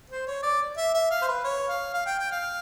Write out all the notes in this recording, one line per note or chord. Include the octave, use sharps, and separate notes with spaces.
C5
C#5
D5
E5
E5
F5
C5
B4
C#5
F5
F5
G5
G5
F5